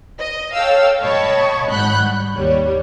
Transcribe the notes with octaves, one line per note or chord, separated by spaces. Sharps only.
D#5
A4 C#5 F5 G5 E6
C#5 D#5 G5 A5 B5 C#6
G#1 G#2 F#5 B5 F#6 G6
G3
D#2 G3 C#5